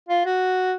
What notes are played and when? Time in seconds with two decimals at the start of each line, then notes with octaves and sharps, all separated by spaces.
0.09 F4
0.26 F#4